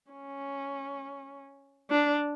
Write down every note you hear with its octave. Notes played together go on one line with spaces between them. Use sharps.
C#4
D4